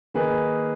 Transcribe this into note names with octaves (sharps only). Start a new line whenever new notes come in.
D#3 A#3 D#4 G#4 B4